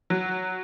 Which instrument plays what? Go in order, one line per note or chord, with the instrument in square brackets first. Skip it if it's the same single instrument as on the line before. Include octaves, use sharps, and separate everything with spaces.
[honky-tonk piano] F#3